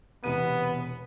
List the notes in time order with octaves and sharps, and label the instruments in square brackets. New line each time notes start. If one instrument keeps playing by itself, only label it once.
[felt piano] E1 C3 D#7 [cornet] B3